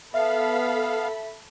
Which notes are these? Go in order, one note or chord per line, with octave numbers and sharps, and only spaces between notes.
B3 A4 E5 F5 B5